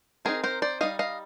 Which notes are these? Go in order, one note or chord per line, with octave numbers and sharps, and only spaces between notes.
G3 C4 D#4 G#4 A#4
A#4 C5
C5 D5
G3 C4 D#4 D#5 F5
D#5 F5